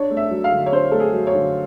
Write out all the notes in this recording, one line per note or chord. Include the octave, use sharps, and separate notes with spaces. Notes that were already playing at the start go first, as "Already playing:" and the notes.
Already playing: D4 C#5
A3
E5
F#3
F5
D3
C#5
D4 C5
A3 A4
G#4
F#3
C#5
D3